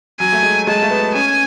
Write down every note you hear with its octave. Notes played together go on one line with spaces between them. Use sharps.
F#3 G#5
A3
G#3
G#3 A5
A3
B3
C#4 G#5